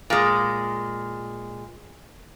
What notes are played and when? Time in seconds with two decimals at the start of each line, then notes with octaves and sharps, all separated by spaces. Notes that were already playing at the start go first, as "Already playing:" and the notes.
0.10 A#2 G#3